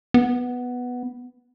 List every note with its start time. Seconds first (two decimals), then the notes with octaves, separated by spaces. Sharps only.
0.14 B3